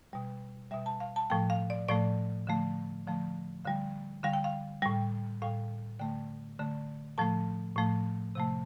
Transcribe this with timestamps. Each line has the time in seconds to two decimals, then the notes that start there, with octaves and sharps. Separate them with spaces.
0.13 B2 G3
0.71 B2 G3 E5
0.86 A5
1.00 F5
1.16 A5
1.30 A2 F3 A3 G5
1.50 F5
1.70 D5
1.88 A2 F3 A3 D5
2.47 D3 F3 A3
3.07 D3 F3 A3
3.65 D3 G3 F5
4.23 D3 G3 F5
4.33 G5
4.44 F5
4.82 A2 G3 G5
5.42 A2 G3 F5
5.99 D3 A3 G5
6.59 D3 A3
7.18 A2 F3 A3 A5
7.76 A2 F3 A3
8.35 C3 F3 A3